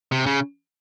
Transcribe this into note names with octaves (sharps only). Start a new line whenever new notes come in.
C3
C#3